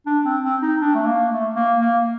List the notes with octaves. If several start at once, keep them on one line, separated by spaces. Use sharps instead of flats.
D4
C4
C4
D#4
D4
A3
A#3
A3
A#3
A#3